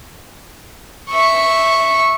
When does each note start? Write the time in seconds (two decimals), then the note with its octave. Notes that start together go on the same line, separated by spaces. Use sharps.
1.09 E5 C#6